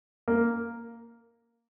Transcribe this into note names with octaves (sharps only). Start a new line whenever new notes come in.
A#3